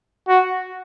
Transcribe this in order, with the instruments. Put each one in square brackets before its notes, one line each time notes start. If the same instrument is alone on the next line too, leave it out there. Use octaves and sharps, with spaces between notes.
[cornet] F#4